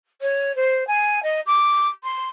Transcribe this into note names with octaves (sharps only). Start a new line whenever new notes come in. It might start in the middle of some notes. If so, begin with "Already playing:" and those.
C#5
C5
G#5
D#5
D6
C6